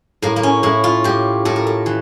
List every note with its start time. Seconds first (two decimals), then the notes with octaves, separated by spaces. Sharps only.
0.22 A2 A#3
0.36 A#3
0.43 C#4
0.63 A2 E4
0.84 F4
1.04 A2 G4
1.45 A2 A4
1.56 A#4
1.67 A4
1.86 E3